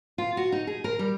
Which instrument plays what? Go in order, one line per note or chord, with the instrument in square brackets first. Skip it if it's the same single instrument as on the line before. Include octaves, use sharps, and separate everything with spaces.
[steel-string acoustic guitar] F4
F#4
D#4
G#4
A#4
G3